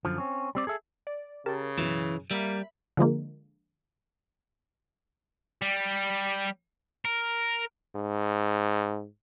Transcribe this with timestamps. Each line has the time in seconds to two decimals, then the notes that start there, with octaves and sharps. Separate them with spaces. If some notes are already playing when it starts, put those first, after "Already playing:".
0.05 F#2 D3 F3
0.18 C4 C#4
0.55 G3 C4 D5
0.67 G#4 A4 E5
1.07 D5
1.46 C#3 G4 A#4 A5
1.78 F#2 B2 E3
2.31 G3 A#3 E5 B5
2.97 D3 F3 G#3 A#3
5.62 G3
7.05 A#4
7.95 G#2